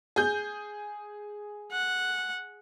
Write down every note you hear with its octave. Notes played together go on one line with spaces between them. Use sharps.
G#4 G6
F#5